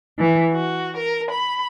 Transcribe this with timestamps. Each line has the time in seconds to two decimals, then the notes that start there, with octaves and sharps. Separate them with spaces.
0.18 E3
0.54 F#4
0.98 A#4
1.32 B5